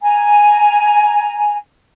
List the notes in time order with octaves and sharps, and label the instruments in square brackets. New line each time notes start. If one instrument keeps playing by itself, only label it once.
[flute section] G#5 A#5